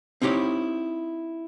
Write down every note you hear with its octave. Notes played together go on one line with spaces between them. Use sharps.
C4 D#4 E4 G4 C#5